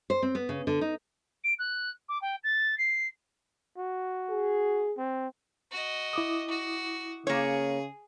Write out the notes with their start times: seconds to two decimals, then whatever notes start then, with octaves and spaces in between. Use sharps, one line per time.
0.10 C5
0.22 C4
0.35 B3
0.49 C#3
0.67 D3
0.81 D#4
1.44 D7
1.59 F#6
2.09 D6
2.22 G5
2.44 A6
2.78 C7
3.78 F#4
4.30 G#4
4.97 C4
5.71 F#4 D#5
6.13 E4 D6 D#6
6.48 F#4
7.27 C#3 A#3 G#4 C#5